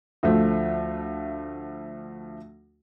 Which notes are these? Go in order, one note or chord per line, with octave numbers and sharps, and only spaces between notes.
D2 F3 A3